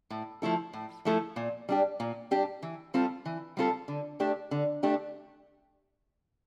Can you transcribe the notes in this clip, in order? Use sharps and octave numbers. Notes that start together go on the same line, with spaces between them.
A2
F3 A3 E4 A4
A2
F3 A3 E4 A4
A#2
G3 D4 G4
A#2
G3 D4 G4
E3
G3 C4 F4 A4
E3
G3 C4 F4 A4
D3
A3 D4 G4
D3
A3 D4 G4